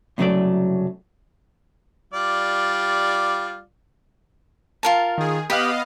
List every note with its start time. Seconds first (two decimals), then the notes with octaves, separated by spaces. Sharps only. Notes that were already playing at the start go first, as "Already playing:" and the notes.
0.18 C2 F#2 C#3 F#3 A3 D5
2.13 G3 F4 D5
4.83 F4 A#4 A5
5.18 D#3 G#4
5.50 B3 G4 B4 D#5 F5 B5